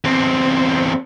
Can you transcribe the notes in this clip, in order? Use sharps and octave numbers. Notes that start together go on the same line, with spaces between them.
E2 C4